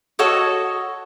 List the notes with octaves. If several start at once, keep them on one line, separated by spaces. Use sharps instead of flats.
F#4 A4 C#5 D#5